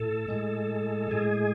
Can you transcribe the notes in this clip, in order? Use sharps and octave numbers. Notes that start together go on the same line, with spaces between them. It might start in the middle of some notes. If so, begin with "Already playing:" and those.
Already playing: A2 A4
A2 G#3
A2 G#3 G#4